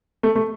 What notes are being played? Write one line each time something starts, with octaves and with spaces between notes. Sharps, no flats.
A3
A3